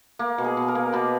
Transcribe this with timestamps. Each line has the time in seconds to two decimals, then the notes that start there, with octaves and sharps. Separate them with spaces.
0.19 A#3
0.38 B2
0.44 G#4
0.57 B2
0.68 A#4
0.75 A#3
0.93 B2 B4